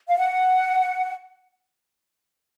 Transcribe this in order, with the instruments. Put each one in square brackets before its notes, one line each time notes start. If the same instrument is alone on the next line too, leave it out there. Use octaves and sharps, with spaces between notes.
[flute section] F5
F#5